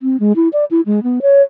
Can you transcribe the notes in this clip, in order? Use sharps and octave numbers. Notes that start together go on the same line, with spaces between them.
C4
G#3
E4
D5
E4
G#3
B3
C#5